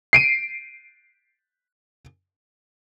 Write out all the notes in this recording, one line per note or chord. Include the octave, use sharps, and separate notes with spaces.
C7 D7 D#7